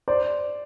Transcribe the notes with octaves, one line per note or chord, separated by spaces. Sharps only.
C5 D5